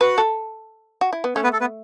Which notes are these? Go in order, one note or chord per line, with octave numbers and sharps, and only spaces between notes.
F#4 B4 F#5
A4
F#4
E4
B3
A3 C#4 C#5
B3 B4
A4
B3 B4